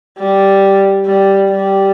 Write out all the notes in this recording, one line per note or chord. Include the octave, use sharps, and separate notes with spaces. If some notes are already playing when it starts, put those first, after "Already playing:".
G3
G3
G3